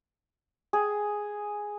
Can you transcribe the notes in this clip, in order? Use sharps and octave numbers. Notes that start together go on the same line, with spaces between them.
G#4